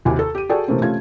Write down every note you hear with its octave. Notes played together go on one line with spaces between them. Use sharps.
D#2 C3 E4 F#4 G#5 D6
A4
G4 D#7
F#4 G#4 A4 D5 G5 A5
C3 E3 A3 A#3 C4 C#4
C3 A3 C#4 F4 G#6